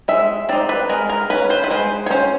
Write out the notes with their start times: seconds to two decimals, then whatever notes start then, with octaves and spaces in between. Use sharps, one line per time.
0.08 G#3 E5
0.49 C4 D#4 D5
0.69 B4
0.89 G#3 A#4
1.10 A#4
1.30 C#4 B4
1.50 C5
1.64 B4
1.70 G#3 C5
2.06 C#5
2.10 C#4 C5